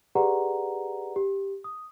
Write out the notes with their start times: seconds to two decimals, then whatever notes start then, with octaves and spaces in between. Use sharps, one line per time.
0.15 G4 G#4 B4 D5 F#5 A#5
1.16 G4
1.64 D#6